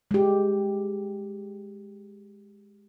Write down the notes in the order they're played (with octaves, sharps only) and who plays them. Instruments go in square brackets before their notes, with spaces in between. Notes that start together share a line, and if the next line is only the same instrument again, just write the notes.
[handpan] G#3 G4